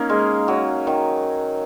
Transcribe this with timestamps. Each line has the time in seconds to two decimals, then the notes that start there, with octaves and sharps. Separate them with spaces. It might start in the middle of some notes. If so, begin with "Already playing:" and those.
Already playing: A#3 C#4 D#4
0.09 G#3
0.48 F#3
0.87 D#3